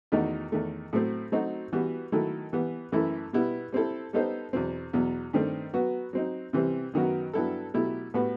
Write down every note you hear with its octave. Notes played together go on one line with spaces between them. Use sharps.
E2 D#3 A3 D#4 F#4
E2 D#3 A3
A2 F#3 A3 C4
F#3 A3 C4 D#4 F#4
E3 G3 B3 F#4
D#3 F#3 A3 E4 A4
E3 G3 B3
F#2 E3 A3 E4 A4
B2 G3 B3 E4
G3 C4 E4 A4
G3 B3 D#4 A4 C5
E2 B2 F#3 C4
E2 B2 F#3
G2 D#3 A3 C4
F#3 B3 F#4 B4
F#3 C4 D#4
C3 E3 G3 C4
F#2 D#3 F#3 B3 F#4
G2 F#3 B3 E4 A4
B2 F#3 A3 E4 G4
A2 G3 B3 F#4 B4